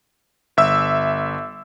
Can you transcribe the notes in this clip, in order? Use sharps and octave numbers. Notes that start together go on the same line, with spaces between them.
G1 E5 E6